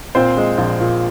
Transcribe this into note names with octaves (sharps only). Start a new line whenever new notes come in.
A#2 C4 C5
G#3
A#1
A#2